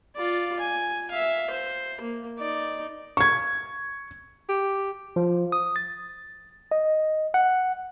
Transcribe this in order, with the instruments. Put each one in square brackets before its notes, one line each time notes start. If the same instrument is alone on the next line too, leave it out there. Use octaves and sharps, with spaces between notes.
[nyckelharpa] F4 D5
G#5
E5 F5
C5
A#3
D#4 D5
[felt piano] C#6 G#6
[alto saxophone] G4
[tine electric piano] F3
D#6
A6
D#5
F#5